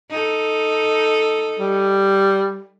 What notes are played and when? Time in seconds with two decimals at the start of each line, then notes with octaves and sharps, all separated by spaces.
0.10 D#4 A4
1.59 G3